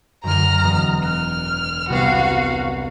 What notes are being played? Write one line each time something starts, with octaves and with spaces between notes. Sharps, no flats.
F#2 D3 A#5 F6
E1 D#6
F6 F#6
C2 C3 B3 F#4 F5